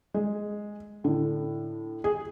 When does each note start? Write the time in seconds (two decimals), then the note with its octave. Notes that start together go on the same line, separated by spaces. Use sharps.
0.14 G#3
1.04 A2 D3
2.04 G#4